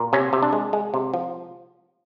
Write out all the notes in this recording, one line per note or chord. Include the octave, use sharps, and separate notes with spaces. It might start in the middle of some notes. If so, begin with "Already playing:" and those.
Already playing: A#2
C3 C#4
C3
D4
G#3
G#3
C3
F3